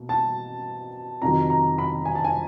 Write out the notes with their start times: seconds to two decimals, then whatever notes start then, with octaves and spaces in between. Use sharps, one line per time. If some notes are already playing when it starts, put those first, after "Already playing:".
Already playing: B2 A#3
0.09 A5
1.22 F2 C3 D#3 F#3 A#5
1.50 A#5
1.78 B5
2.05 G#5
2.15 A5
2.24 G#5